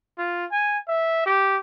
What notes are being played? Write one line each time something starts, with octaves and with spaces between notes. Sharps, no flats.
F4
G#5
E5
G4